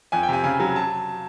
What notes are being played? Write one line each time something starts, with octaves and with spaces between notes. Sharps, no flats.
F2 G#5
G5
C3 G#5
C#3 G#5
F#3
A5